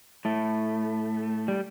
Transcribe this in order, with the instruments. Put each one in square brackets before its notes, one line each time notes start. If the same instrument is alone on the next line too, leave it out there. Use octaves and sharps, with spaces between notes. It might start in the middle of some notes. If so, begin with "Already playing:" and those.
[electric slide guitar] A2 A3
G3